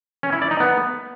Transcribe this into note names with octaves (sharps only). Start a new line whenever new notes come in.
C#4
E4
D5
D#4
B3